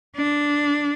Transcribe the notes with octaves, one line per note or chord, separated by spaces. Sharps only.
D4